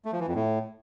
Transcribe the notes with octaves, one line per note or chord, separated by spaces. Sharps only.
A3
F3
E3
F2
A2